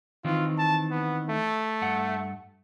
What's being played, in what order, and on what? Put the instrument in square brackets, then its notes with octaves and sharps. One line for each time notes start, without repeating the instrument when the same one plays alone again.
[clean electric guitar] D#3 E3 C4 [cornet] F4
[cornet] A5
B3
A3
[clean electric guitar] G2 F#5